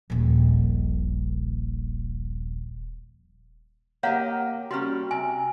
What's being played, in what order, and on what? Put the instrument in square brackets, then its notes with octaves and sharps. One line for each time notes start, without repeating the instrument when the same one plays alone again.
[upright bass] D#1 A#1
[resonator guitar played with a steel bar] A#3 G4 D#5 [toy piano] C#5 F5 F#5
[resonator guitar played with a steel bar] G3 A#3 C#4 [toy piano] F#4
[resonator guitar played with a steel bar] C3 [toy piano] G#5